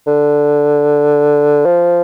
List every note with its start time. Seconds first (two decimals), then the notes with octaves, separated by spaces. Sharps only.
0.07 D3
1.65 F3